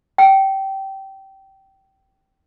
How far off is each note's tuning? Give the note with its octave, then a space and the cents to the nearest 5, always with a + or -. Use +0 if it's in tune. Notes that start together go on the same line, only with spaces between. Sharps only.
G5 -20